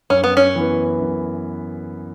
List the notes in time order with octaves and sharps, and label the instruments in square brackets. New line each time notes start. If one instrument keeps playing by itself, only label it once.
[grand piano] F#2 [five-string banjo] C#4
[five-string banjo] B3
C#4
[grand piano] E3 B3 E4 B4
F#2